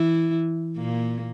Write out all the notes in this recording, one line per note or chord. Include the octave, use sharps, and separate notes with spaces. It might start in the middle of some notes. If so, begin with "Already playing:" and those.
Already playing: E3 E4
A#2 A#3